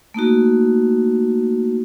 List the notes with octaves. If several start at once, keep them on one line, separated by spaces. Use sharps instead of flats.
A3 A#3 D#4 F#4